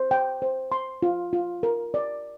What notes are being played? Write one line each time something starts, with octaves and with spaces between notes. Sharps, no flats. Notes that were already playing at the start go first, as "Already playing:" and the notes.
Already playing: C5
G5
C5
C6
F4
F4
A#4
D5